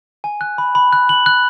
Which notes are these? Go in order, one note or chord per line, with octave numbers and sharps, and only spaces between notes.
G#5
F#6
B5
B5
F#6
F#7
F#6